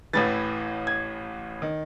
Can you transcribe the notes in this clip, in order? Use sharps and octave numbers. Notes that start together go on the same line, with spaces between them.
A1 A2 E3 A6
G#6
D#3